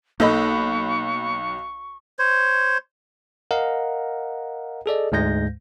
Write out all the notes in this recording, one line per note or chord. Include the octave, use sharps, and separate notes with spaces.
B1 A#3 D#4 A4 D#5 B5 C#6
C5 C#5
A#4 D#5 F5 F#5 A#5
G#4 A4 D5 D#5
D2 G#2 G#3 G6 A#6